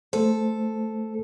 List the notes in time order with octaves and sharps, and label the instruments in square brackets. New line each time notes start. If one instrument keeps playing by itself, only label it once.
[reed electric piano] A3 C5 [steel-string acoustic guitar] A4